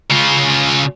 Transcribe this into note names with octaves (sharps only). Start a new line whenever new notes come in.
C#3 F4